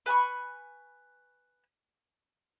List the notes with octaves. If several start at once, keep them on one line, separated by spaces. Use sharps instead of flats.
B4 G#5 B5 C#6